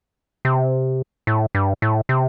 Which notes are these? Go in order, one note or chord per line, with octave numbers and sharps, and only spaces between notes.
C3
A2
G2
A2
C3